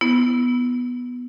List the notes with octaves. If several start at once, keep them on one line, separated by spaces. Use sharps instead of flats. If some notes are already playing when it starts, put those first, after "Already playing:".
B3 E4